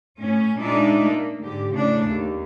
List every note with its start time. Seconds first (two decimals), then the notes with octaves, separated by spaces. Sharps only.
0.17 A2 C#4
0.58 A#2 G#3 D4 D#4 F4 E5
1.06 A#3
1.42 G#2 D3 G4
1.73 A2 C#3 A3 D4
2.08 D#2